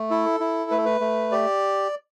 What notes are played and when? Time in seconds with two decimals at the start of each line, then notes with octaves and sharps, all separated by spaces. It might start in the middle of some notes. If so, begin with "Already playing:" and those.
Already playing: A3
0.10 E4 A4
0.40 E4
0.71 A3 B4
0.78 A4
0.85 B4
1.01 A3
1.32 G4 D5